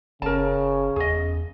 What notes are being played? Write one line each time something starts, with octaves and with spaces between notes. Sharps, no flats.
F#1 C#3 C#4 A#4 A5
E2 G#4 D#5